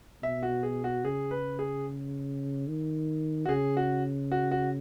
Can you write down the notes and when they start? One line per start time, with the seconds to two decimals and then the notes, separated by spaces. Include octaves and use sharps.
0.23 B2 E5
0.43 F#4
0.63 G#4
0.84 F#4
1.05 C#3 G#4
1.31 B4
1.59 G#4
2.68 D#3
3.45 F#4
3.49 C#3 G#4
3.77 F#4
4.32 F#4
4.51 F#4